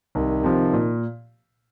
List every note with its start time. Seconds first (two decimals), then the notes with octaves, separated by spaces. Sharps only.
0.15 C2 D#3
0.43 C3 F3
0.73 A#2